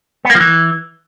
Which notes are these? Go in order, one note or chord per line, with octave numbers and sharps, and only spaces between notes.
B3
A#3
F3
E3